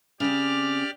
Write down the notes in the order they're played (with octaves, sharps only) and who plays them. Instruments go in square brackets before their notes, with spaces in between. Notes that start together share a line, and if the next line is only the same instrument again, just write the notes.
[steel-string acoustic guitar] C#3 C4 [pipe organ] G4 D5 F6